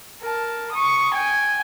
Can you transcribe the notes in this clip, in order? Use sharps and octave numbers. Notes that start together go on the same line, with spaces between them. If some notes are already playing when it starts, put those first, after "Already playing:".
A#4 A5
C#6 D#6
G5 G#5